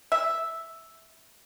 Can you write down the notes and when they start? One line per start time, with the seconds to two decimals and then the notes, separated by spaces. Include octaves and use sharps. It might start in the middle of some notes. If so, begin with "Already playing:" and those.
0.12 E5